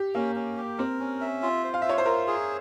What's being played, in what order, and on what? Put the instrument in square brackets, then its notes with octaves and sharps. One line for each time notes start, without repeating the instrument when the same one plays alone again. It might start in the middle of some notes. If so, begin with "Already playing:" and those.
Already playing: [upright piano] G4
[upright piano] A#3 [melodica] C#4
[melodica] C#4
G4
[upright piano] C4 [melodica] A#4
[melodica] C#4
E5
F4
C5
[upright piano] F5
E5
[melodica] F4 [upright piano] C#5
[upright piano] C5
[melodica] F4 [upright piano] A#4
[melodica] G#4